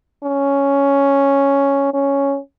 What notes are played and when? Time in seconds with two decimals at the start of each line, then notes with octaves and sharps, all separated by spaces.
0.23 C#4
1.94 C#4